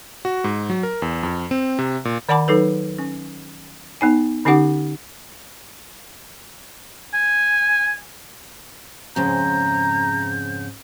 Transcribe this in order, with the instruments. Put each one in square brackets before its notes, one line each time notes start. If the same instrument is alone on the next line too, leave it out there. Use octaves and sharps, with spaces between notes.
[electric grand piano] F#4
G#2
F#3
A#4
E2
F2
C4
C3
A#2
[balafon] D#3 D5 F#5 A5 B5 D6
F#3 D#4 A4 B4
C#4
B3 D#4 G#5
D3 C#4 D#4 G4 F#5 D6
[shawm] G#5
[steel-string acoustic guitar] F2 G#2 C#3 [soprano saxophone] A#5 [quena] G6